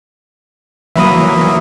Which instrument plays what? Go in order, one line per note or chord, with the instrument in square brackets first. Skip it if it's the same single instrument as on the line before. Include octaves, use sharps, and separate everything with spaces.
[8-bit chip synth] E3 F#3 A#3 [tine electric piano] E5 B5 D#6